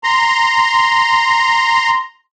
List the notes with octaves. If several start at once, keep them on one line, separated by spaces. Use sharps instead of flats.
A#5 C6